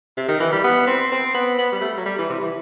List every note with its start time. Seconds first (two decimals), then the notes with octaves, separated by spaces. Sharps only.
0.17 C3
0.28 D#3
0.40 E3
0.52 G3
0.64 B3
0.87 C4
1.12 C4
1.34 B3
1.58 B3
1.72 G3
1.81 A3
1.97 F#3
2.05 G3
2.18 E3
2.29 C3
2.41 E3